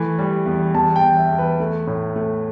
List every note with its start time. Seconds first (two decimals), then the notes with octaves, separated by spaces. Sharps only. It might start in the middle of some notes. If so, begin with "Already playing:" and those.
Already playing: E3 A3
0.19 G3
0.46 E2
0.74 E2 A5
0.96 G5
1.03 E2
1.17 E5
1.31 E2
1.38 B4
1.60 A3
1.87 A2
2.16 A3